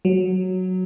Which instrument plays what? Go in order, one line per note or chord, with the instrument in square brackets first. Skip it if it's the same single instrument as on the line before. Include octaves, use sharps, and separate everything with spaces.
[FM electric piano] F#3